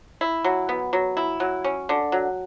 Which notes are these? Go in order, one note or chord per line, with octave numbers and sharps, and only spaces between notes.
E4
F#3
B3
F#3
E4
F#3
C#4
D3
F#3